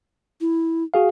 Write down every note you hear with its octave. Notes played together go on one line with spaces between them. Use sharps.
E4
F#4 G#4 F5